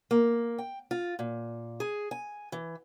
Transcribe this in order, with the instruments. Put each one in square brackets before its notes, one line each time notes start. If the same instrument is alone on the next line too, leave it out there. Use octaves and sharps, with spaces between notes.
[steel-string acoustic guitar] A#3
G5
F4
A#2
G#4
G#5
E3